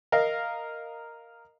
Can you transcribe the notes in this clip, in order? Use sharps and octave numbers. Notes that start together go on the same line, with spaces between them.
A#4 D#5 F5